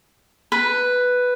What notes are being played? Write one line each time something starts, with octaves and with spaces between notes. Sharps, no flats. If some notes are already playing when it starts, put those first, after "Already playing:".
B4